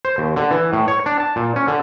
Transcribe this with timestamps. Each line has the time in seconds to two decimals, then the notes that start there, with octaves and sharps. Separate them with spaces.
0.05 C5
0.18 D#2
0.36 D3
0.51 E3
0.73 A2
0.88 C#5
1.06 D4
1.20 A5
1.36 A#2
1.56 C#4
1.68 D3